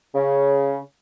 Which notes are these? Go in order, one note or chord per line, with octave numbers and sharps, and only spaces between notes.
C#3